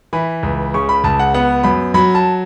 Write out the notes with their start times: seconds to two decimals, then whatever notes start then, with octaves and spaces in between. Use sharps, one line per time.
0.13 E3 B5
0.43 C#2
0.74 C#3 C#6
0.89 B5
1.04 C#2 A5
1.19 F#5
1.34 B3 F#5
1.63 F#2 B5
1.94 F#3 B5
2.15 A5